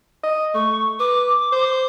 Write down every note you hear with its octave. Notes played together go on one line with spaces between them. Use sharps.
D#5
A3 C#6
B4 D6
C5